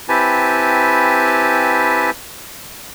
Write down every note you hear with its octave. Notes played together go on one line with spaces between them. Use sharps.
C4 E4 G4 B4 G#5 A5